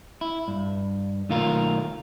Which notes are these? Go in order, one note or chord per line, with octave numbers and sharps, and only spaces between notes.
E4
G2
B1 D#3 A3 F4 A#4 F5